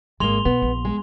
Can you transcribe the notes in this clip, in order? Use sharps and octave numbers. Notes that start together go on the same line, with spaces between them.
G#1 G#3 A#3 C6 F7 G7
B2 B3
A#1
G#3